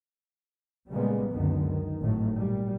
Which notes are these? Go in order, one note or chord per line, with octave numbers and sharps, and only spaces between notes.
A#2 C#3 G3 G#3 A#3 B3
C#2 F#2 D3 D#3 B3
D#3
G#1 A2 D#3 F#3 A3
A#2 G3